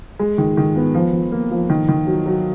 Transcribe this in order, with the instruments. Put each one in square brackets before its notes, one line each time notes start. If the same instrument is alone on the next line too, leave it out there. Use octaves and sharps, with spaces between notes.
[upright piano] G#3
D#3
D#3
B3
F3
F3
A#3
F3
D#3
D#3
F#3
F#3